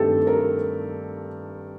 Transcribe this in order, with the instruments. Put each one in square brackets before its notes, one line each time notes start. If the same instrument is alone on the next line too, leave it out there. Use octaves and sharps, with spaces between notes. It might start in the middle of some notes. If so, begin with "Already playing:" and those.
Already playing: [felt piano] G2 D#3 A3 C4 G4 A4
A#4